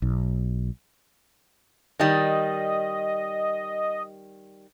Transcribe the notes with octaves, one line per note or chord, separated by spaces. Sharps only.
B1
D#3 G3 D#5